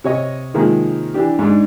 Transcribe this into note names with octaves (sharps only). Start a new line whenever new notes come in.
C3 C#5 D#5
C3 D#3 F3 G#3 A#3
E3 D4 G4
G#2 G#3 D4 D#4